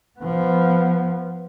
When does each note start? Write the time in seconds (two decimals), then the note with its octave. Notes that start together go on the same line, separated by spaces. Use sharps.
0.19 F3 B3